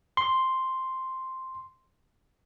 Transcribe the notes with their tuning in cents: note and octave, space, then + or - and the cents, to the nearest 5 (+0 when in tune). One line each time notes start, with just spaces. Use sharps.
C6 +0